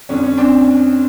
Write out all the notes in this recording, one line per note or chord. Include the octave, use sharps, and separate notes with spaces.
F2 D3 G3 C#4
C#4
C4 D4